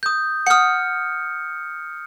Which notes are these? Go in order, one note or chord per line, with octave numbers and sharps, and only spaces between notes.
D#6 G6
F#5 D#6 F6 C#7